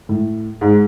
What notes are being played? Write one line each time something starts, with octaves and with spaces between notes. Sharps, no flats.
A2
G#2